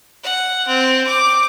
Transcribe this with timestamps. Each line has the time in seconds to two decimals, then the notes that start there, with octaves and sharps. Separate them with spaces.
0.23 F#5
0.67 C4
1.07 D6